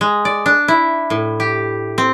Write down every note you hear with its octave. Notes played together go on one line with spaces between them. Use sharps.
G#3
D5
D4
E4
A2
G4
C4